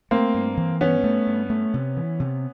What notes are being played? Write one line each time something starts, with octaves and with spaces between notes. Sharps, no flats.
A3 A#3 C4
G2
E3
G2 B3 C#4
A3
G2
A3
C3
E3
C3